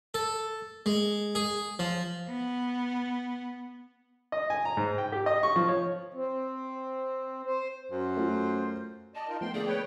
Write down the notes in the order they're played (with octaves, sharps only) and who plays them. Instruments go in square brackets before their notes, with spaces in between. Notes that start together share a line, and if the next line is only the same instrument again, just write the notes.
[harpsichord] A4
G#3
G#4
F3
[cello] B3
[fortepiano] D#5
G#5
A#5
G#2
G5
G4
D#5
C#6
F3
C#5
[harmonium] C4
C5
[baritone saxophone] F#2 [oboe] C5
[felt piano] A3 F4
[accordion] D5 D#5 [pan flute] A5
[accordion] D#4 F4 A#4
[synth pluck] F3 A3 B3 [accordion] G5 C6
[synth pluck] D3 A3 A#3 [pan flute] G#4 [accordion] D5
[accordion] B4 C#5 G5